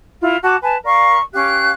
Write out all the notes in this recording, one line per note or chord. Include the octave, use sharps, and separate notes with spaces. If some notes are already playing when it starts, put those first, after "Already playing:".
E4 F4
F#4 A5 D6
B4 G#5 A5
A#4 D5 F5 C#6
C#4 G4 F5 F#6